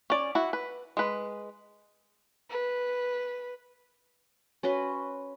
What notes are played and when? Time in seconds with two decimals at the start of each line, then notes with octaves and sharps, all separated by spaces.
0.10 C#4 D5
0.35 E4 F#4
0.53 B4
0.97 G#3 B4
2.50 B4
4.63 C#4 F#4 B4 C6